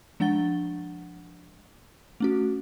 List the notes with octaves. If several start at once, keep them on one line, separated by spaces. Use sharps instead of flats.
F3 G#3 D4 F#5 A6 G7
A3 C#4 F#4